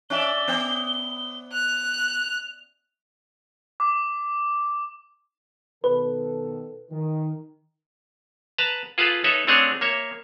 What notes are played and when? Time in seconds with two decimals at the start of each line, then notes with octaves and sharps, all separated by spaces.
0.10 C#4 D5 E5 G7
0.48 B3
1.53 F#6 F7
3.80 D6
5.84 B2 D#3 A4 B4
6.91 D#3
8.58 B4 A5 A#5
8.98 F4 G#4 A4 B4 F5
9.24 D#4 A4 B4 C#5 E5
9.47 A3 C4 D4 G#4 C#5 F#5
9.81 A#3 C#5 E5